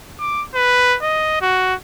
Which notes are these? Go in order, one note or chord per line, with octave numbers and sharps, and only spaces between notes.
D6
B4
D#5
F#4